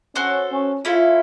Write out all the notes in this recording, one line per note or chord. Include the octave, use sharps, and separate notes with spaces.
C#4 F#4 A4 C5
C#4
C#4 E4 F4 A4